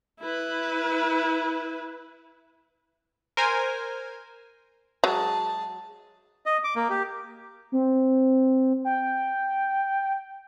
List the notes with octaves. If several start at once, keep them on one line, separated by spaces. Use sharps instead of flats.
E4 B4
A#4 C5 G#5
F#3 G#3 G#4 A5
D#5
D6
A#3
G4
C4
G5